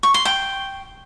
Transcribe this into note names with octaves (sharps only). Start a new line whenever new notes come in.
C#6
C6
G5